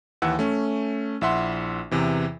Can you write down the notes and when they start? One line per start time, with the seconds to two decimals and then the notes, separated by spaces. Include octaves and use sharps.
0.22 D#2 E3 F#5 E6
0.39 A3 C#4
1.21 A#1 E4 E5 F#5 C6
1.91 E2 C3 E3